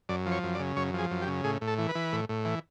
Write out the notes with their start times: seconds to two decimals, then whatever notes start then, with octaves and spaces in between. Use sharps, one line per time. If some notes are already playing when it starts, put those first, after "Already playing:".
0.09 F#2 D5
0.26 F3
0.32 C#5
0.43 F#2
0.55 D5
0.60 C#3
0.76 F#2 C#5
0.94 F3
0.99 G#4
1.11 F#2
1.22 G4
1.27 C#3
1.44 A2 G#4
1.61 A2
1.68 A4
1.78 E3
1.89 B4
1.95 E3
2.13 A2
2.29 A2
2.45 E3